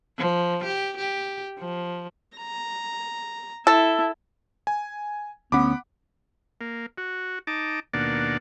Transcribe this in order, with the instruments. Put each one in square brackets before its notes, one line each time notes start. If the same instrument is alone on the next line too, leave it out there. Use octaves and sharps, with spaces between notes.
[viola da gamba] F3
G4
G4
F3
[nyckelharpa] A#5
[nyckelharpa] E4 [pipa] A4
[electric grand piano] G#5
[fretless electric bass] D2 C#4 [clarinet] B3 [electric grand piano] F#5 B5 D6
[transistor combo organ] A#3
F#4
D#4 A5 D6
D#2 B2 A#3 D4 D5 F#5